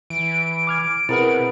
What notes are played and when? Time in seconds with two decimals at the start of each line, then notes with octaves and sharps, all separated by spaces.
0.10 E3 D7
0.67 D6 F6 G#6
1.09 B2 C4 E4 G#4 A#4 B4 F#5